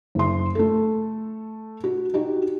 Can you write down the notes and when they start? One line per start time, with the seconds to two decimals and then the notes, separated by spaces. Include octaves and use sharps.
0.15 F#1 C6
0.55 A3 A4
1.84 F#4
2.14 D#4 F#4 G4